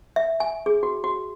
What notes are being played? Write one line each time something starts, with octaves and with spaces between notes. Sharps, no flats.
E5
G#5
G#4
F#4
F#4